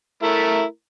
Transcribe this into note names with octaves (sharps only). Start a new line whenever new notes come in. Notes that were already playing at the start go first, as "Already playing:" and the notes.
A3 E4 A#4